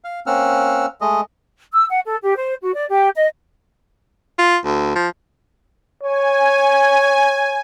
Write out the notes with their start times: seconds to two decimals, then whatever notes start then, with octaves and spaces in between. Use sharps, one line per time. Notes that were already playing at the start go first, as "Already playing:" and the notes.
0.04 F5
0.27 A#3 C4 C#4 F#5 E6 F6
1.01 G#3 A3 D#5
1.72 E6
1.90 F#5
2.05 A4
2.22 G4
2.36 C5
2.62 F#4
2.75 D5
2.89 G4
3.15 D#5
4.38 F4
4.65 D2
4.95 F3
6.03 C#5 G#5